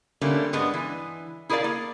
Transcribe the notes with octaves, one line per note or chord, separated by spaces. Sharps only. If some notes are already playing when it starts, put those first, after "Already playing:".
D3 G3 A3 A#3 C#4
G2 G#3 B3 D4
E3
E4 G#4 A#4 B4 D5 F5
A#3